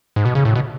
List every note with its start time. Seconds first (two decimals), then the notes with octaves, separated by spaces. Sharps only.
0.16 G#2
0.25 B2
0.35 C#3
0.45 A2
0.56 B2